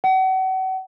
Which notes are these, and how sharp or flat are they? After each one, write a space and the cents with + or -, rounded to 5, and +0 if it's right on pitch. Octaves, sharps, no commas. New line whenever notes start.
F#5 +35